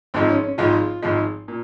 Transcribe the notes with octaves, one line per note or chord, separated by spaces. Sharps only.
G#1 G#2 F3 G#3 C4
C#4
C#4
G#1 G#2 F3 G#3 F4
G#1 G#2 F3 G#3
A#2